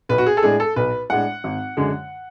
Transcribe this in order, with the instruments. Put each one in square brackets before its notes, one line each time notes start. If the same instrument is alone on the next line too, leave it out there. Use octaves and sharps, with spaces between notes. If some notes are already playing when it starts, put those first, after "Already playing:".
[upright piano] B1 B4
F#4
G#4
A4
A2 G#3 D4 G#4
A4
B1 B4
A2 G#3 D4 F#5
G#1
F#2 D3 G#3